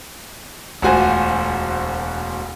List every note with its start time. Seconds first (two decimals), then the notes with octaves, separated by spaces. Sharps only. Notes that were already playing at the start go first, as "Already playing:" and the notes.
0.82 E1 D2 F4 F#4 C5 G#5